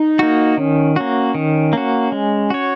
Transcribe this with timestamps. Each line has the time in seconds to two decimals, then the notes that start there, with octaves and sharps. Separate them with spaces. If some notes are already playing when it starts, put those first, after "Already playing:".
Already playing: D#4
0.19 A#3 F#4
0.57 D#3 C#4
0.96 A#3 C#4 F#4
1.35 D#3
1.73 A#3 F#4
2.12 G#3
2.50 F#4 C#5